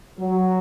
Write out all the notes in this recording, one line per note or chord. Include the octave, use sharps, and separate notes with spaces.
F#3